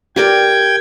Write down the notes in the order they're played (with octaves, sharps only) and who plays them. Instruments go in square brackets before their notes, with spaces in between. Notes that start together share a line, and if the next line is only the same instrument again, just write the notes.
[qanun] G4 A#4 D5 [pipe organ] G5 G#6